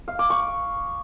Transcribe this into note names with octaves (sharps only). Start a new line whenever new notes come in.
F5
D6
C#6